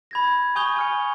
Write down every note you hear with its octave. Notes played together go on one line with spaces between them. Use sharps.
B5 G#6 A#6
G#5 C#6 D#6 G6 F7 G7
G#5 F6 C#7